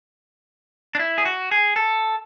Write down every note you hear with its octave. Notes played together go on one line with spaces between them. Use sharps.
D4
E4
G#4
F#4
G#4
A4